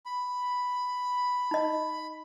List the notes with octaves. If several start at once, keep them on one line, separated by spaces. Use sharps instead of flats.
B5
D#4 D#5